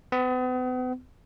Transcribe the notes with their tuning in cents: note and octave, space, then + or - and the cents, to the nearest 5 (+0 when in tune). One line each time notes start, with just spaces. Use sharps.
B3 +40